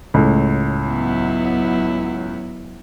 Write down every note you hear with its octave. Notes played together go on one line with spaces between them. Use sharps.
C#2 A2
F#3 B3 E4